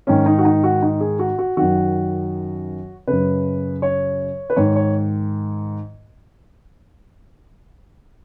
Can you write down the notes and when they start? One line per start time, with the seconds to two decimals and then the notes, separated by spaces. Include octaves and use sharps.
0.07 G#2 D#3 C#4
0.26 D#4
0.38 F#4
0.45 D#4
0.63 F#4
0.82 D#4
1.00 G#4
1.19 F#4
1.39 F#4
1.57 F#2 D#3 F#4
3.07 F#2 C#3 B4
3.82 C#5
4.50 B4
4.56 G#2 D#3 C#5
4.76 C#5